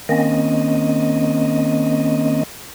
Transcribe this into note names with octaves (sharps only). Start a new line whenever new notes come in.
D#3 A#3 C4 C#4 D#5